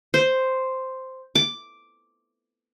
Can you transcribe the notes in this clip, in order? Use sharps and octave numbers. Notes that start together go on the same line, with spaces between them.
C5
D6